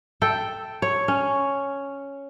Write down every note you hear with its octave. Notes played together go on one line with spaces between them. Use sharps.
A4 G5
C#5
C#4